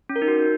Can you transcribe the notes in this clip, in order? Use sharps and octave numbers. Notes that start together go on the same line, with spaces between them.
C#4
A#4
D#4
F#4